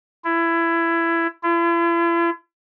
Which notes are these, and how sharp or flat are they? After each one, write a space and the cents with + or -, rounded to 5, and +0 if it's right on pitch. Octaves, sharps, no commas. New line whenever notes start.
E4 +20
E4 +45